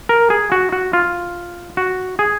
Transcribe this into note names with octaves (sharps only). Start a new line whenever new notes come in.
A#4
G#4
F#4
F#4
F4
F#4
G#4